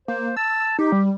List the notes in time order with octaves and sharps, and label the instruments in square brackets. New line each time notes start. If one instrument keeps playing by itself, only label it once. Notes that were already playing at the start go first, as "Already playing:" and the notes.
[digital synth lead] A#3 [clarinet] C5
[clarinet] A5 [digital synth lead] E6
[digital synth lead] D#4 [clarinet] G4
[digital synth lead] G3